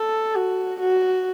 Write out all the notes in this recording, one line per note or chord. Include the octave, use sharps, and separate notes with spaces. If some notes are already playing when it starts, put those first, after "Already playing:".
Already playing: A4
F#4
F#4